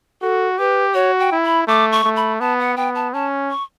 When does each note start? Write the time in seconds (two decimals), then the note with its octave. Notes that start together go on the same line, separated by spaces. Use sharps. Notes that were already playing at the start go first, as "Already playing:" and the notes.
0.22 F#4 A4
0.59 G4 B4
0.94 F#4 C#5
1.20 G5
1.32 E4
1.44 B5
1.68 A3 D6
1.92 C#6
2.04 A3
2.16 B5
2.40 B3 A5
2.60 F#5
2.77 B3 G5
2.95 A5
3.14 C#4 A5
3.50 C#6